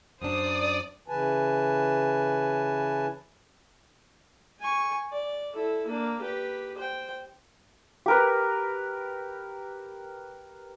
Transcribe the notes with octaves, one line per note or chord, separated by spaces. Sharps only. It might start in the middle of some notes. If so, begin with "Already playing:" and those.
F#2 D4 C5 D5 D#6
C#3 E3 B4 G#5 A5
G#5 C#6
D5
E4 A4
A#3 D4
G4 B4
C5 G5
G4 A#4 B4